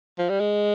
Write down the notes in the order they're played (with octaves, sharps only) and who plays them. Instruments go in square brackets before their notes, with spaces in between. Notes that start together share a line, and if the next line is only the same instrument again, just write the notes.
[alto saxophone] F3
G3
G#3